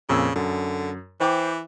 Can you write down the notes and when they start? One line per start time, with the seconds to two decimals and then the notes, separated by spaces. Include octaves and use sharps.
0.09 F2 A#2 C#3 E6
0.36 F#2 D3
1.20 E3 C5 G5 D6